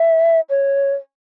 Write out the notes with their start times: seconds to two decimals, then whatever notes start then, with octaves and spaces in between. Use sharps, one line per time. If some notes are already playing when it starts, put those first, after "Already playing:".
Already playing: E5
0.50 C#5